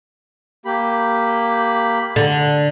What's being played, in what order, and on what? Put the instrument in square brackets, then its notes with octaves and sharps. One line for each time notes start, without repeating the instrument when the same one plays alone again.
[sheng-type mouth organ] A#3 G4 B5
[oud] D3